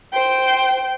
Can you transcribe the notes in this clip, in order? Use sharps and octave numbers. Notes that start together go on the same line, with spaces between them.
C5 G5